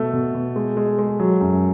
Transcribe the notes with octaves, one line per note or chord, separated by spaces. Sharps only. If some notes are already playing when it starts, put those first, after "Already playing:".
Already playing: B2 A3
B2
B2
G#3
G#3
G#3
F#3
F#2